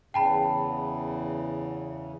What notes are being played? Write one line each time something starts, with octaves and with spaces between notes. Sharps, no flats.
E2 C#3 G5 A5 B5